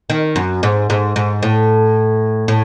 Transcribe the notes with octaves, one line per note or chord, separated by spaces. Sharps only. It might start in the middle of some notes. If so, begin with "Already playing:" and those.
D#3
F#2
G#2
G#2
G#2
A2
A2